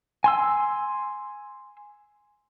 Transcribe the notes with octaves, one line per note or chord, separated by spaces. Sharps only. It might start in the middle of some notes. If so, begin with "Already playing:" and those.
G#5 C6 E6